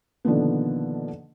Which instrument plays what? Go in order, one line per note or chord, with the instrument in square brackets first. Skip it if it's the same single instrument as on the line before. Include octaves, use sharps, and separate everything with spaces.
[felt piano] B2 D3 D#3 F3 A#3 B3